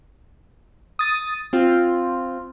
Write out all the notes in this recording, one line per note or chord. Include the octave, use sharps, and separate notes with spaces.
D#6 A6 D#7
C4 F4